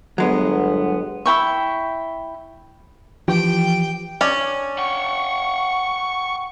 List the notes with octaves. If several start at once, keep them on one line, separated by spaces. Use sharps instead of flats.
G1 F#3 G#3 B3
E4 G5 C#6
E3 F3 G4 G5
C#4 D4 C#5 D5
F#5 G5 C#6